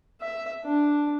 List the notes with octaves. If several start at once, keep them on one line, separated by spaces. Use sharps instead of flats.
E5
D4